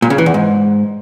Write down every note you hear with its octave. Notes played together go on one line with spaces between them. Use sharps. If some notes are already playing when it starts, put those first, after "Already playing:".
A#2
C#3
E3
E2
G#2